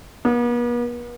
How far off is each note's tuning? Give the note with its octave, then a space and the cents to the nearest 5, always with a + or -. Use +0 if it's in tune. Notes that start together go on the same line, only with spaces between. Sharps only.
B3 -45